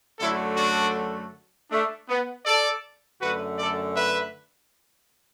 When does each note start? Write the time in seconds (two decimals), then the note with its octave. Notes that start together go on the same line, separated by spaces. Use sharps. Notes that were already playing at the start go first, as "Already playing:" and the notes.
0.19 F#2 D3 F#3 A3 E4 A4
0.57 D4 F#4
1.71 A3 D4
2.09 B3
2.46 A4 D5
3.21 F#2 D3 A3 F#4 B4
3.59 A4 D5
3.97 B4 E5